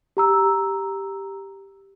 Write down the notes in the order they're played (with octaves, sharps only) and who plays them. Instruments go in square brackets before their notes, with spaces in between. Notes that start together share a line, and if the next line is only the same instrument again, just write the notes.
[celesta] G4 A#5 E6